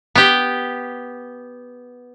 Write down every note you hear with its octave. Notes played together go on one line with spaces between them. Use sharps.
B3 G4